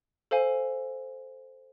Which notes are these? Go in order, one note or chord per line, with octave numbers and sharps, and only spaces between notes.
A4 C5 F5 G#5